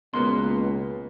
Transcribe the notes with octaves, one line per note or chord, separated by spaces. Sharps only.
C#2 B2 A#3 B3 C6